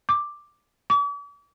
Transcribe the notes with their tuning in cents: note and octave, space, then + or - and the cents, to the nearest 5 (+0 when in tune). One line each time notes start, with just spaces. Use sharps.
D6 +5
D6 -45